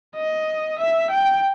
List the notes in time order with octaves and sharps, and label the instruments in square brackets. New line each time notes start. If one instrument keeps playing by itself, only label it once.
[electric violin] D#5
E5
G5